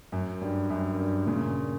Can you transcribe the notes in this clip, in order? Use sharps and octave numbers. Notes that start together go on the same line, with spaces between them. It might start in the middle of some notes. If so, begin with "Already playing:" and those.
F#2
G2
F#2
G2
A#2 C#3